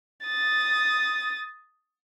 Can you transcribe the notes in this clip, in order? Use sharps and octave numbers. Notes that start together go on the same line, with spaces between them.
D#6 A6